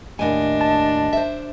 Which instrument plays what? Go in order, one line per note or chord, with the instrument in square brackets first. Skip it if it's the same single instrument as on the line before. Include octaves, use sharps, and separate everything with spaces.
[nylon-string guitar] D#2 A2 G#5 [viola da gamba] D4 [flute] D#5
[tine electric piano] A5
[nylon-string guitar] C5 E5